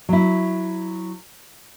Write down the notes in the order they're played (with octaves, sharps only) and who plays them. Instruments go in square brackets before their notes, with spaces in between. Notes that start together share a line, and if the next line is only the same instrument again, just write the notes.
[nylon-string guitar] F#3 E4